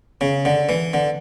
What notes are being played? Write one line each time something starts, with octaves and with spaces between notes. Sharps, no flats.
C#3
D3
E3
D3